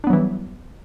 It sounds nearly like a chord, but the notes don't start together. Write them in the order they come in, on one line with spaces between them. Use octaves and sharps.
D4 B3 F#3 E3 G3